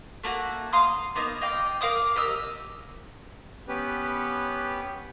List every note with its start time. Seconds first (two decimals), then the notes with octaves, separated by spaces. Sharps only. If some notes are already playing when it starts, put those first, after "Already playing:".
0.24 A3 A#3 F#4
0.73 F5 A#5 C6 D#6
1.15 A#3 B3 D#4
1.41 D#5 F5 G5 D6
1.81 A#4 F5 D6 D#6
2.16 G4 A#4 D#5 E6
3.68 B3 C#4 G4 B4